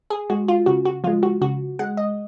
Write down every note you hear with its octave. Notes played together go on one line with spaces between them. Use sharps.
G#4
G#3 F#4
F4
C#3 F#4
F#4
F3 G#3 F4
F#4
C#3 F#4
G#3 F#5
D#5